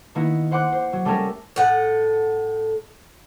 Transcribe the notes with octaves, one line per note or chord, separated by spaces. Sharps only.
D#3 A#3 B3 D#4 E4
C5 F#5 C6 D6 F#6
C5
F#3
G3 A3 A#3 C#4 A4 A#4
A2 A4 F#5